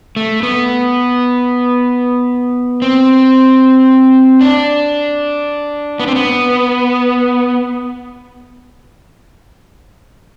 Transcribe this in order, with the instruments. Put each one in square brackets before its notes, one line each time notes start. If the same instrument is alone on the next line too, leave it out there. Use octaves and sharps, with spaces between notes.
[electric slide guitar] A3
B3
C4
D4
B3
C4
B3